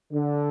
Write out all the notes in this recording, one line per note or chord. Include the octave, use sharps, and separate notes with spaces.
D3